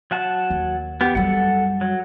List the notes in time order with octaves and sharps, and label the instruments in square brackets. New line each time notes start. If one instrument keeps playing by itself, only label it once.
[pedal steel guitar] F#3 F#5 A5
[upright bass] D#2
[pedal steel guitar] B3 G4
[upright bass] F#2 G3 [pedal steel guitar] A4 F#5
[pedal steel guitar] F#3